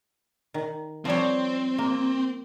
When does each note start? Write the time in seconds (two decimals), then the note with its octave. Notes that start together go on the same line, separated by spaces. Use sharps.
0.54 D#3
1.05 F3 G3 C4 C#5
1.78 A#3